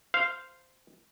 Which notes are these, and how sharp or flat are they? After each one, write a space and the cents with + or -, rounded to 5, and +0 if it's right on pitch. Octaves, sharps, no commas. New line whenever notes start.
C5 -10 F5 -10